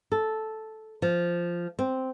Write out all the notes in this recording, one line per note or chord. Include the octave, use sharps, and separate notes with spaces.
A4
F3
C4